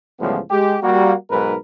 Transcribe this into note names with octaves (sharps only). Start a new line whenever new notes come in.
C#2 A2 E3 F3 G3 B3
G#3 G4
G3 A#3 F#4
B1 G#2 A#4 B4